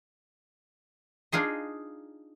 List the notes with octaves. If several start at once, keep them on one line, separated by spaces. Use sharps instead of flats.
D4 D#4 F4 G#4 D#5